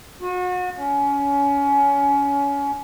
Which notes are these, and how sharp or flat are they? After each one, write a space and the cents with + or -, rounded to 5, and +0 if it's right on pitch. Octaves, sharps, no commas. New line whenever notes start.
F#4 -35
C#4 +25